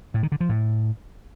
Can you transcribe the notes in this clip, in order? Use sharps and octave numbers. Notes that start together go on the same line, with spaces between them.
A2
D#3
D3
F3
A2